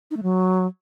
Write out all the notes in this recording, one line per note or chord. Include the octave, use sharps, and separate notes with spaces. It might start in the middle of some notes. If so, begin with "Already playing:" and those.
D#4
A3
F#3